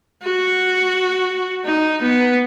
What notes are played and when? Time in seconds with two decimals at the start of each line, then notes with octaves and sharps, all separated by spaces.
0.23 F#4
1.65 D#4
2.02 B3